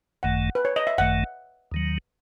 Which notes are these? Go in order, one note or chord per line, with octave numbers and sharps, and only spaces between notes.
G#1 F#2 D#3 A3 F#5
B4
C#5
D#5
E5
G#1 F#2 D#3 A3 F#5
D#2 D#3 F#3